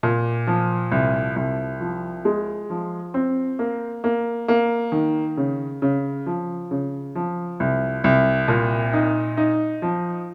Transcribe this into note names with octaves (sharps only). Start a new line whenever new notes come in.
A#2
F3
C2
C2
F3
G#3
F3
C4
A#3
A#3
A#3
D#3
C#3
C#3
F3
C#3
F3
C2
C2
A#2
D#4
D#4
F3